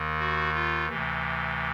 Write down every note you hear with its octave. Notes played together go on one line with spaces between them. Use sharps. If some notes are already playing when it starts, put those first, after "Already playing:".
Already playing: D#2 D#3
F#4
F4
D2 C3 E3